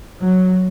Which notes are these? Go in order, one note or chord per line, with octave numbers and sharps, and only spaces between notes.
F#3